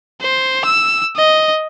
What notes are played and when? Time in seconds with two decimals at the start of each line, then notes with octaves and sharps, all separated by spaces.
0.21 C5
0.65 E6
1.17 D#5